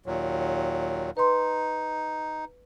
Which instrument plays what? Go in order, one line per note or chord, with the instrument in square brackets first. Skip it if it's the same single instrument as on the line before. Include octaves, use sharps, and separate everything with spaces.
[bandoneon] D#2 A#2 F#3
[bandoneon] D#4 [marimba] B4 C6